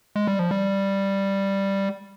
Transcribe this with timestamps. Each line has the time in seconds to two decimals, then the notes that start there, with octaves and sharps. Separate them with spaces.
0.16 G#3
0.27 G3
0.39 F3
0.51 G3